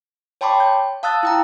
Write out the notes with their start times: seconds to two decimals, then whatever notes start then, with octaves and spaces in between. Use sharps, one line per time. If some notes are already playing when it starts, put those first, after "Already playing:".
0.41 C#5 G5 A5 B5 C6 D6
0.60 G6
1.03 F5 A5 D#6 E6 F#6 A6
1.23 E4 G5 A#5